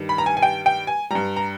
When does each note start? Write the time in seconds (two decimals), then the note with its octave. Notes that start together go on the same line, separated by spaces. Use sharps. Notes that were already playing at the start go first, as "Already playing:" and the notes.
Already playing: G2 D#3 G3
0.09 B5
0.18 A#5
0.26 G#5
0.37 G#5
0.42 G5
0.66 G5
0.87 G#5
1.10 G2 G3 A#5
1.36 A#5